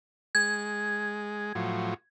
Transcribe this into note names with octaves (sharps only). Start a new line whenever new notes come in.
G#3 G#6
A2 F3 F#3